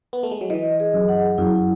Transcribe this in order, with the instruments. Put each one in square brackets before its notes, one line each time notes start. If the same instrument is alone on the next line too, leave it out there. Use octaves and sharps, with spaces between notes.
[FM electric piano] B3
A3
G#3
F#3
[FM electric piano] E3 [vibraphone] D#5
[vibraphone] G#4
[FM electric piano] F#2
[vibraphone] F#5
[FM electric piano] F#2 [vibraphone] E4